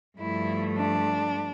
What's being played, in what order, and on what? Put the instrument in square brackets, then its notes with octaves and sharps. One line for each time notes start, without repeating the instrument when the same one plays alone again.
[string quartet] G2 F3 A3 E4
D4